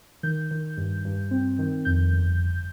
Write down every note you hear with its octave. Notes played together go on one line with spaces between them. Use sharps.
D#3 G6
D#3
G2
G2
C4
D#3
F2 G6
G1
G1